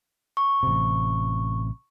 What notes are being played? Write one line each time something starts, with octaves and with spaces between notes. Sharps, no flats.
C#6
A1 C3